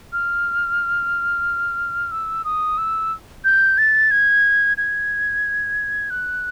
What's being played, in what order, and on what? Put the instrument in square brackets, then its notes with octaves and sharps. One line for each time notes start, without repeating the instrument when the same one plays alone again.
[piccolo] F6
E6
D#6
E6
G6
A6
G#6
G#6
F#6